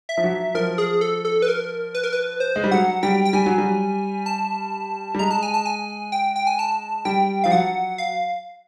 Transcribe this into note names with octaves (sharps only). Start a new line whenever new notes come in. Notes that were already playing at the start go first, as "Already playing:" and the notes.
E5
F3
F#3
F3 A#4
G#4
A4
A4
B4
A#4
B4
A#4
B4
C5
G#3
G3
F#3 F#5
G3 G5
G5
G3 G#5
F#3
G3
A5
G3
G#3 A#5
A5
G#5
A5
G#5
G5
G5
G#5
A5
G3 G5
F3 F5
F#3 F#5
F5